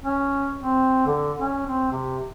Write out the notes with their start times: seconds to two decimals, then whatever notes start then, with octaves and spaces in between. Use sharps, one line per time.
0.03 C#4
0.62 C4
1.07 D3
1.39 C#4
1.67 C4
1.92 C3